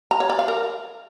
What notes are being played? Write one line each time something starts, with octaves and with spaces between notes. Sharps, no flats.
A#5
C#5
D5
F5
A#4